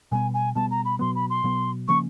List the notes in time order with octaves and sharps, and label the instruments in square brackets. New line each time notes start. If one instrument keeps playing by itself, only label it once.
[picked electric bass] B2 G3 B3 [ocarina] G#5
[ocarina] G#5
[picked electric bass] B2 G3 B3 [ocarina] A5
[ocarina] A#5
B5
[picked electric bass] B2 F#3 B3 [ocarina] C6
[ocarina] B5
C6
[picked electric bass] B2 F#3 B3
[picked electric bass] C#3 F3 A#3 C#4 [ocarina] C#6